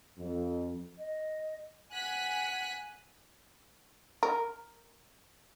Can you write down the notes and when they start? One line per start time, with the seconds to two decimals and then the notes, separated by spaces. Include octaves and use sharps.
0.18 F2
0.98 D#5
1.92 F#5 G#5 F#6 B6
4.23 A#4